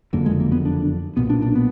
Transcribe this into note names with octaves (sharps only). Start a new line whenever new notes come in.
F#1 F2 D3 A#3
G#3
A#3
B3
D4
B1 A#2 B3
D4
D4
B3